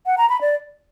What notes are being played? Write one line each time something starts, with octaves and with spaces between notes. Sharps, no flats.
F#5
A#5
B5
D5